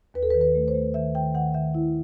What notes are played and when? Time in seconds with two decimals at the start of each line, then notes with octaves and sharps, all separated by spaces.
0.14 D#2 B4
0.23 A4
0.30 B4
0.34 D#3
0.41 B4
0.55 A3
0.68 C5
0.75 A3
0.94 D#3 E5
1.15 D#3 G5
1.34 D#3 F#5
1.54 D#3 E5
1.74 E4